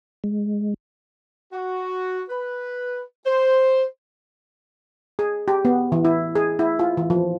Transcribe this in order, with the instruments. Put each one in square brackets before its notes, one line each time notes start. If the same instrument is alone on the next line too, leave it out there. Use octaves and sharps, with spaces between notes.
[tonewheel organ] G#3
[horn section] F#4
B4
C5
[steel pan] G#4
G4
B3
E3
E4
G#4
E4
F4
E3
F3